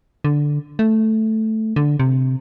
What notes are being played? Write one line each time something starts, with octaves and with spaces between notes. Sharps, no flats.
D3
A3
D3
C3